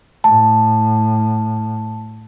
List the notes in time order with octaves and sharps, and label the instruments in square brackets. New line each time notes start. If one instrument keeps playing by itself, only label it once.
[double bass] A2 [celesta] A5